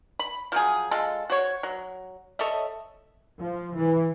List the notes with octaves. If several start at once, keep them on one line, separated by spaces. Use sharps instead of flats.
B5
F3 F#3 G#4
G#3 F4 A4
F#4 C5 C#5
F#3
A4 C#5 D#5 E5
F3
E3